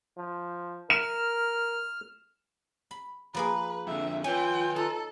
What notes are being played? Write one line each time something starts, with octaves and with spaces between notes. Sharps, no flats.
F3
A#4 F6 E7
B5
F3 A#3 G#4 B4
F2 D3 E5
C#4 F4 B4 G5 G#5
D#4 A4